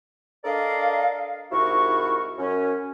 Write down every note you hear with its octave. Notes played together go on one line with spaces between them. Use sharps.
D4 A4 A#4 D5 D#5 F5
C2 G#2 E4 F#4 A#4 C#6
F#2 C#4